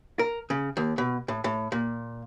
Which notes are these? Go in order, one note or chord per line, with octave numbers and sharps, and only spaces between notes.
A#4
C#3
D#2
B2
A2
A2
A#2